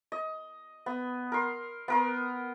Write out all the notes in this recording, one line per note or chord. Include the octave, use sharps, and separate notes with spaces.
D#5
B3
A#4 C6
B3 A#4 C6